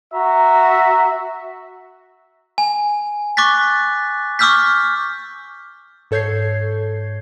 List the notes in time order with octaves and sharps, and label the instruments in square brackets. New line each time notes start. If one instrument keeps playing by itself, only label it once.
[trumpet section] F#4 E5 A#5
[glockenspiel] G#5
C#6 D6 F#6 A6 B6
C#6 D6 E6 F6 G6 B6
[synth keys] G#2 A4 C#5 G6 G#6 C7